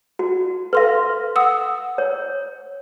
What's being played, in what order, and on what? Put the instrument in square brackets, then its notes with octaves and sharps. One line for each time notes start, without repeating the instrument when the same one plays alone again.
[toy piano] F#4
[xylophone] A4 C6 A#6 [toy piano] B4 F5
[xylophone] F#5 D#6 E6
[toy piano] C#5